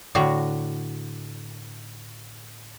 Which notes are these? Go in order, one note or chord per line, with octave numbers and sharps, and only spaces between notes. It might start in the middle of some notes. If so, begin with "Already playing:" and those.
A2 D3 F#4 A#5